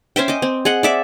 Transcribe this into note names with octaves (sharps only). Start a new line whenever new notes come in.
C#4 C5 E5 G5
D#5 D6
C4
G#4 D#5 F#5
D5 E5 D6